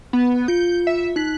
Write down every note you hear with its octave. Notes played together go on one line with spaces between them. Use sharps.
B3
F4 G6 C#7
E5
D#4 F#6 B6